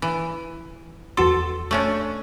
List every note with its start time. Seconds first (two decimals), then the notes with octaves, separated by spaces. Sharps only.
0.02 E3
1.17 E2 F#4 A4 C6
1.71 A3 C#4 D4